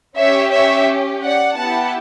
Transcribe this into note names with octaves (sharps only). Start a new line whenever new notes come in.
C#4 G4 C#5 E5
C#5 E5
D5 F#5
B3 E4 G4 F#5 A5